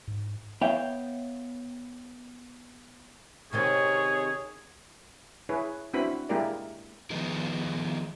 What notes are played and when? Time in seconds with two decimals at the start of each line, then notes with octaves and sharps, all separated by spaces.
0.08 G#2
0.61 B3 C#5 E5 F5 G5
3.53 C3 D#3 C4 G#4 C#5
5.49 E4 G#4 B4 C#5
5.94 C4 D4 E4 F#4 B4 B5
6.29 G#3 A#3 E4 G4 A#4 D5
7.10 D#3 F3 G#3 B3